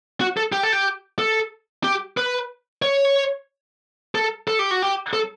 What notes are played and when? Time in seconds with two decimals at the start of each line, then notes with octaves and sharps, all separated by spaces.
0.21 F#4
0.37 A4
0.52 G4
0.63 A4
0.72 G4
1.19 A4
1.84 G4
2.17 B4
2.82 C#5
4.15 A4
4.48 A4
4.59 G4
4.71 F#4
4.82 G4
5.13 A4